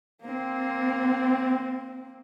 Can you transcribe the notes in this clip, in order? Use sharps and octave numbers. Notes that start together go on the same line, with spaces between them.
A#3 C4